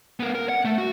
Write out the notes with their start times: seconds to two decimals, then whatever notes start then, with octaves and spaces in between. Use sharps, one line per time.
0.20 B3 A#4
0.35 A#4
0.49 F#5
0.65 A3
0.78 F#4